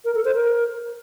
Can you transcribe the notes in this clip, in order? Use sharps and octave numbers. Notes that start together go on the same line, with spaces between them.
A#4
A4
C5
A#4